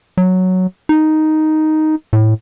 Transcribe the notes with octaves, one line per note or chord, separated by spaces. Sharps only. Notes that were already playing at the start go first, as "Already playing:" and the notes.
F#3
D#4
A2